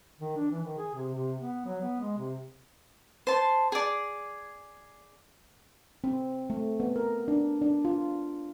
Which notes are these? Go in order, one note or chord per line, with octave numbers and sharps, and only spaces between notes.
D#3
D4
E3
D#3
G#4
C3
C3
B3
F#3
B3
G#3
C3
C5 A5
G#4 D5
C4
A3
B3
A#4
D4
D4
F4